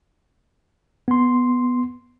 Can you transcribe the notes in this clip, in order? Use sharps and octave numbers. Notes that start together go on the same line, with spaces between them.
B3 C6